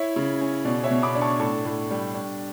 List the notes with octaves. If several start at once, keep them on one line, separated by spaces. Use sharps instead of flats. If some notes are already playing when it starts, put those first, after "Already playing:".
Already playing: E4 C#5 E5
C#3
C#4
B2 D5
C#5 E5
B2
B5 D6
D4
A5 C#6
A2 A5 C#6
A2
G3
D4